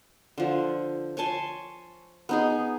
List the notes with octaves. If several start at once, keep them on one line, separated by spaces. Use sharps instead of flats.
D3 F3
C#5 G#5 A5 C6
B3 D#4 G#4